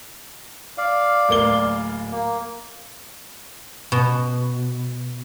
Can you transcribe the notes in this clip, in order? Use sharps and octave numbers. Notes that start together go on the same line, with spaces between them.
D5 F5
D1 A#3 G7
A#3
B2